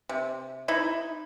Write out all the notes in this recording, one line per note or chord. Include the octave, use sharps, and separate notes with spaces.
C3
D#4 E4